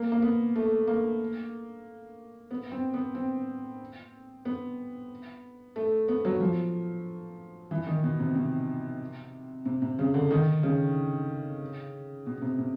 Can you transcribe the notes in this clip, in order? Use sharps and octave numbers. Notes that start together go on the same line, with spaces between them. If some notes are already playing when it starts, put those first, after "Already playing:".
Already playing: A#3
A#3
B3
A3
A#3
B3
C4
B3
C4
B3
A3
B3
F#3
F3
E3
D#3
B2
C3
C3
C3
C3
C#3
D3
D#3
C#3
B2
C3
C3